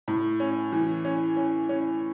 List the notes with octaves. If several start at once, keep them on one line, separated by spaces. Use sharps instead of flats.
A2
C#4
E3
C#4
C#4
C#4